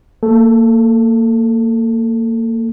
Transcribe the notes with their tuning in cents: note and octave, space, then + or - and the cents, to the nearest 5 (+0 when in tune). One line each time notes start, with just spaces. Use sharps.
A#3 -30 A4 +0